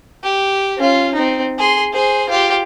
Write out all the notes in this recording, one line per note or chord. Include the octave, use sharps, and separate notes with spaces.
G4
C#4 F4
C4 D#4
G#4 C6
G#4 C5
F4 G4